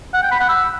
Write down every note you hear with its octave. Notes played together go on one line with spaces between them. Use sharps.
F#5
G5
B5
F#5
E6